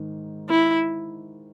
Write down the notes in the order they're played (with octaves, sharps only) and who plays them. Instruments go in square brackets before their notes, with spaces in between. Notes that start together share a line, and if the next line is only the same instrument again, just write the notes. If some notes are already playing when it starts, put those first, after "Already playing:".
Already playing: [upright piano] G#2 D#3
[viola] E4